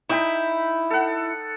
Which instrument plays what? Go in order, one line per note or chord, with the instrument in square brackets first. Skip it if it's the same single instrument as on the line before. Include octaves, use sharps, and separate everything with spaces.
[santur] D#4 G5 B5 [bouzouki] E4
[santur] A4 F#5